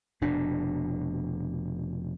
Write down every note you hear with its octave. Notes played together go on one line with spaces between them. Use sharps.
F1 B2 D4